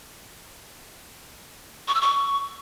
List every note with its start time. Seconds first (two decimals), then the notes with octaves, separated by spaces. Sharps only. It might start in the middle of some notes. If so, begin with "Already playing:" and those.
1.88 C#6
1.95 E6
2.01 C#6